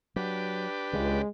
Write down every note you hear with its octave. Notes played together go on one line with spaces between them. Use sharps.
F#3 D4 G4 B4
C#2 C#3 G#3